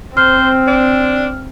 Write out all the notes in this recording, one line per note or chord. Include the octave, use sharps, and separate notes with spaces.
C4 C5 F6
D4